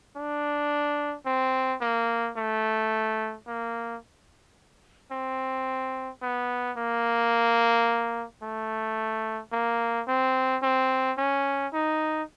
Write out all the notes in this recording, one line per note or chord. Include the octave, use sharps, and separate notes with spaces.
D4
C4
A#3
A3
A#3
C4
B3
A#3
A3
A#3
C4
C4
C#4
D#4